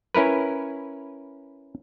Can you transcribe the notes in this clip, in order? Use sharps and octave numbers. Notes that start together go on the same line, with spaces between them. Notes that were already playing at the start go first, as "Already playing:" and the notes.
C#4 E4 A#4 B4